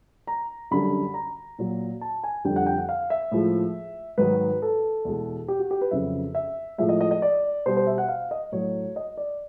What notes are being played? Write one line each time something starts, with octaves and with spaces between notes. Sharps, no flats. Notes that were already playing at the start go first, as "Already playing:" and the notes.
A#5
F#2 D3 G3 B5
A#5
A#2 F#3
A5
G#5
F2 D3 G3 G5
F#5
G5
F#5
F5
E5
A2 F3 G#3
G#2 D#3 F#3 B4
A4
E2 B2 G#3
G4
F#4
G4
B4
F2 C#3 F#3 E5
E5
A2 F3 G#3 E5
D#5
D#5
D#5
D5
B2 G3 C5
C5
E5
F#5
F5
D#5
A2 F#3 C#5
D#5
D5